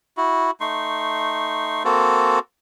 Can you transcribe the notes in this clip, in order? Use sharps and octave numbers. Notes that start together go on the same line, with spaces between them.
E4 F#4
A3 D#4 C6 C#6
A#3 C4 F#4 A4